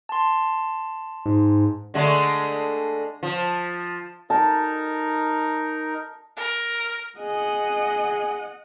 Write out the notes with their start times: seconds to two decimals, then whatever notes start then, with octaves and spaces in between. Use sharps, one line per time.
0.09 A5 C6
1.26 G#2
1.94 D3 G#3 A3
3.23 F3
4.30 D#4 A#4 A5
6.37 A#4
7.18 G#4 D#5 F#5